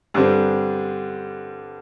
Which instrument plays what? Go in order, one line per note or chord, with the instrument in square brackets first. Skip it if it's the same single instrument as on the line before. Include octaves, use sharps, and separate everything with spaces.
[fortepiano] G2 D3 G3 C4